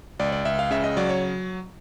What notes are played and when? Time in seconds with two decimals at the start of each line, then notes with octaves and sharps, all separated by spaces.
0.19 C#2 D5
0.32 D5
0.45 C#2 E5
0.59 F5
0.71 C#3 E5
0.84 D#5
0.97 F#3 D5
1.09 C#5